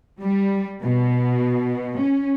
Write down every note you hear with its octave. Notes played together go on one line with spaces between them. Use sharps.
G3
B2
C#4